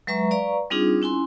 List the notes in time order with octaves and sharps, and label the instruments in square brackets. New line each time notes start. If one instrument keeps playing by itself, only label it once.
[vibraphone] F#3 G#3 B4 E5 A#5 C#6
B4 D5 F5 A#5 C#6
G3 C4 D4 D#4 F4 G#4
C#4 E4 G#5 C6